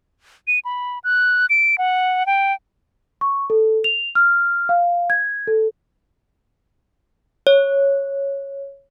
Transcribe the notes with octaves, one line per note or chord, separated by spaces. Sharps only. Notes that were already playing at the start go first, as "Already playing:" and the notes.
D#7
B5
F#6
D7
F#5
G5
C#6
A4
F7
F6
F5
G#6
A4
C#5